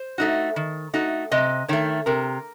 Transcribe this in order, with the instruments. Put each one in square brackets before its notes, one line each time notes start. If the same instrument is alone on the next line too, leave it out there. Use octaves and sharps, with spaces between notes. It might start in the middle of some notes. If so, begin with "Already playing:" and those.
Already playing: [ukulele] C5
[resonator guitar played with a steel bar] A3 D#4 F#4
D#3
A3 D#4 F#4
[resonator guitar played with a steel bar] C3 [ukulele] D#5
[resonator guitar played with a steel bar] D#3 A3 [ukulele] C#5
[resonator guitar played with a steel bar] C3 [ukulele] A#4